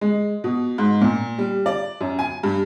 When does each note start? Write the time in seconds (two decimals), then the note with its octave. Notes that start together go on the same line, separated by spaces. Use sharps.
0.01 G#3
0.44 B2
0.78 G#2
1.01 A#2
1.38 G3
1.66 D5
2.01 F#2
2.19 G#5
2.43 G2